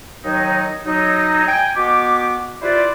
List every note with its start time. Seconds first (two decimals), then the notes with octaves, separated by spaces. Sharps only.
0.25 D#2 D#3 F#3 D#4
0.86 F#3 D#4
1.46 D#5 G5 G#5
1.76 B2 B3 F#4 G4 D6
2.62 E4 F4 G4 B4 C5 D5